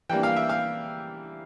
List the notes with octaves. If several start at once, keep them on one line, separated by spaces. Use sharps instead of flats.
E3 G3 A#3 D4 G5
F5
E5
F5